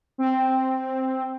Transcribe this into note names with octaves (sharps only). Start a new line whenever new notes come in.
C4